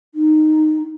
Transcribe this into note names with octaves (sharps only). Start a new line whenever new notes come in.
D#4